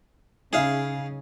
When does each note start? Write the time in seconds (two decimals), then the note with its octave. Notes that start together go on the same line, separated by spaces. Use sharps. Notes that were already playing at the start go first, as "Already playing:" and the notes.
0.53 C#3 D#4 G#4 E5 F5